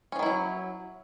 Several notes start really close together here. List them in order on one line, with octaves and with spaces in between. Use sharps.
C#4 F3 D#3 E4 F#3